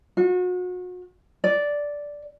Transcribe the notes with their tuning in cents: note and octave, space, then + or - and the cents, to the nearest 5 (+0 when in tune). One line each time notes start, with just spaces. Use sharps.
F#4 -35
D5 -5